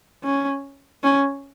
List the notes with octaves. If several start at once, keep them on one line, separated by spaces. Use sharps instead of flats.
C#4
C#4